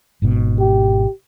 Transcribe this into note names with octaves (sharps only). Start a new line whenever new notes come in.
G#1 G#2 B2
G4